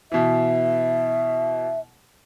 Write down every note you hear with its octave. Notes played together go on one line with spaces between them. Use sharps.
B2 E3 E5